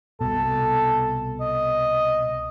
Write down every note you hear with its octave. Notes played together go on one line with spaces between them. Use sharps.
C2 B2 A4
D#5